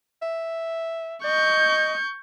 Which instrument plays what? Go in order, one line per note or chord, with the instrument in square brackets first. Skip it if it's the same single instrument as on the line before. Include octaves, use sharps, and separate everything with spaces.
[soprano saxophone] E5
[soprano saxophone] D#5 [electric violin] C#6 G6